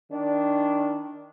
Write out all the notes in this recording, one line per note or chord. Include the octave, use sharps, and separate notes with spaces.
D#3 D4